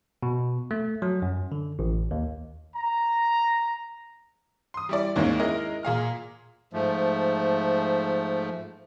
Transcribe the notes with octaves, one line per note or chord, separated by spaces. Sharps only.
B2
A3
F#3
F#2
D3
A1
D#2
A#5
C6 D#6
G3 E4 D5
D#2 G#2 G#3 A#3 C#4 D#4
G#3 E4 A#4 D#5
A#2 G#4 F5 F6
G#2 F3 A3